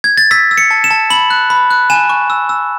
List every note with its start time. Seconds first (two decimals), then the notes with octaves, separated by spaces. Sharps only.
0.04 G#6
0.17 A6
0.31 E6 B6
0.51 E6
0.58 C#7
0.71 A5
0.84 E7
0.91 A5
1.10 B5 F#7
1.30 F#6
1.50 B5
1.70 F#6
1.90 G#5 E7
2.09 C#6
2.30 E6
2.49 E6